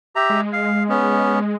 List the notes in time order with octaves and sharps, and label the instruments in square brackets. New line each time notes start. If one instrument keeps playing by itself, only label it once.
[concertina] G4 E5 A#5
[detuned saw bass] G#3
[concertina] F5
B3 C#4